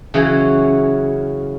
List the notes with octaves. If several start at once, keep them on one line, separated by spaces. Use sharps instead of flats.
C#3 E3 F#3 C#4